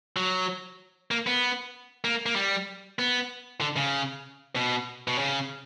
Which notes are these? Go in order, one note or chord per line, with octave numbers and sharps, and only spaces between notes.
F#3
A#3
B3
A#3
A#3
G3
B3
D3
C#3
B2
B2
C#3